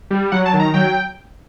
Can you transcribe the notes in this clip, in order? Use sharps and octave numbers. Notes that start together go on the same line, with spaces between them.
G3
F#3 F#5
A5
D#3
A#5
F#3 G5